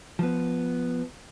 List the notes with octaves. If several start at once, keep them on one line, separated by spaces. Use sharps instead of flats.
F3 B3